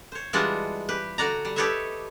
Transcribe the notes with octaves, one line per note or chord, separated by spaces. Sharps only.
C5 C#5
E3 G3 G#3 D4 F4 F#4
G4 B4
D3 F#4 D5 A#5
G3
G4 A4 B4 C#5 D#5 E5